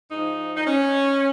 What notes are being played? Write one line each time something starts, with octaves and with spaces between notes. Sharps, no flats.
G#2 F3 D#4
D#4
C#4